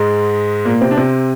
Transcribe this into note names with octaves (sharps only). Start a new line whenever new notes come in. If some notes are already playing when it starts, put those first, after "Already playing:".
Already playing: G#2 G#3
A#2 A#3
C3 C4
D4
C3 C4